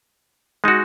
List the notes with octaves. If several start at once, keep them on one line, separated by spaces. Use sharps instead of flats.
G#3 D#4 F#4